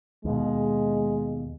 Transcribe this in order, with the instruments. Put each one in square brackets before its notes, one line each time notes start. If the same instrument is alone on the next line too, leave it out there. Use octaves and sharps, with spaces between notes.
[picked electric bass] D#2 B2 [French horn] G#3